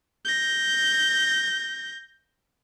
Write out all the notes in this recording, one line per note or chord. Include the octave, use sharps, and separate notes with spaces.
G6 A#6